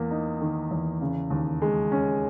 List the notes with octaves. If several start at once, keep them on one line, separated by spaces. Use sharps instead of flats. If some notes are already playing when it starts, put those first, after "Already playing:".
Already playing: E2 A#3
D#4
D#3
E2
C#3
D#2
G#3
C#4